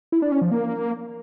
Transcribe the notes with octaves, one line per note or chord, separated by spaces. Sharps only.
E4
D4
C#4
F3
A#3